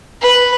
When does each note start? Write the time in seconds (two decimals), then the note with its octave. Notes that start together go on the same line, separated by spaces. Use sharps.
0.22 B4